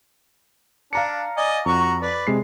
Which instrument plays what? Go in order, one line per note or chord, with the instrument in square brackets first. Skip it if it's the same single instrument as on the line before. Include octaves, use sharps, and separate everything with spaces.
[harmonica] D4 [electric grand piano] F5 A#5 C#7
[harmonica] D5 D#5 G#5
[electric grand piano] F2 [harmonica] F#4 A#5 C#6
[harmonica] B4 D5
[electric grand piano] C3 G#3 C7